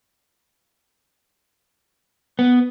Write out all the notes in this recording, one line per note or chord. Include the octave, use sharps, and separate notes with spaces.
B3